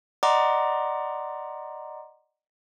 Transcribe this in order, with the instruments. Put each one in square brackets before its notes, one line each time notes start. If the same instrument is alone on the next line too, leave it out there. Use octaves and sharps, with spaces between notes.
[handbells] D5 D#5 F#5 A#5 C6 D6